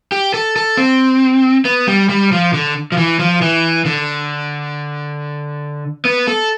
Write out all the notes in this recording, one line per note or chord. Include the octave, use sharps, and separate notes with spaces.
G4
A4
A4
C4
B3
G3
G3
F3
D3
F3
E3
F3
E3
D3
B3
A4